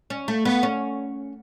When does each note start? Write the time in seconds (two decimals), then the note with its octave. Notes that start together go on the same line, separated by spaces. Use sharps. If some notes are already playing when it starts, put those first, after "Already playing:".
0.10 C#4
0.28 A3
0.45 B3
0.63 C#4